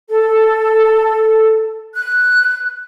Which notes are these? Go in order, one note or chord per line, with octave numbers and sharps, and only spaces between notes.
A4
F#6